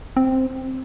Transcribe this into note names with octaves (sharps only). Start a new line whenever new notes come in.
C4